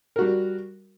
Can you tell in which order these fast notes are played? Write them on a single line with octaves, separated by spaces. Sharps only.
A#4 F#4 G3